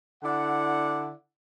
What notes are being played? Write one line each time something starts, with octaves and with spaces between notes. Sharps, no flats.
D3 E4 D5 F#5